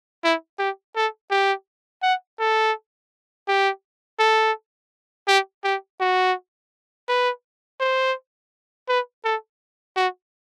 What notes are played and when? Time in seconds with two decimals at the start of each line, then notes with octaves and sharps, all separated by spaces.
0.24 E4
0.59 G4
0.96 A4
1.31 G4
2.03 F#5
2.40 A4
3.48 G4
4.19 A4
5.28 G4
5.65 G4
6.00 F#4
7.08 B4
7.80 C5
8.89 B4
9.25 A4
9.97 F#4